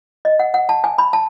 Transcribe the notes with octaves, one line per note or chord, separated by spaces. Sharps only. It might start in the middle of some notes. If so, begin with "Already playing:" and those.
D#5
F#5
F#5
A5
G#5
B5
A5